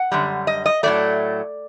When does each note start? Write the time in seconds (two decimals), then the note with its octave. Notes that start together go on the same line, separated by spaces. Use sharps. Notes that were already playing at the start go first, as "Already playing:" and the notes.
Already playing: F#5
0.12 F#2 D3 G3
0.47 D#5
0.66 D#5
0.83 A2 F#3 A3 D5